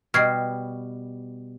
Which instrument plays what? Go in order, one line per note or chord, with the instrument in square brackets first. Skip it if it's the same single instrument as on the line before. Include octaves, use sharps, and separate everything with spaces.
[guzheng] B2 G3 [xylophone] F6 G#6 C7